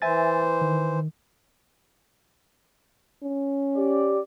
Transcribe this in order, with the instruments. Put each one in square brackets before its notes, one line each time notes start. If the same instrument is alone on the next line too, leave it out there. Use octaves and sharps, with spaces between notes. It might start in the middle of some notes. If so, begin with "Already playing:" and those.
[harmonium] E3 C5 [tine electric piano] E5 G#5 A6
[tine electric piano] D#3
[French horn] C#4
[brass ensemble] G4 D5